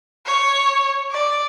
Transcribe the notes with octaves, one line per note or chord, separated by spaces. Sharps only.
C#5
D5